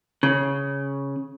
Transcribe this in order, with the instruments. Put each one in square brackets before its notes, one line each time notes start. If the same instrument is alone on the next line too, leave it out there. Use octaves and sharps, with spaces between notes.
[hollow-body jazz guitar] C#3